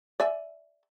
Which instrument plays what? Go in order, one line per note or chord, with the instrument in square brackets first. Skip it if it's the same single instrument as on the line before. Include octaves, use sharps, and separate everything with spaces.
[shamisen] D5 E5 G#5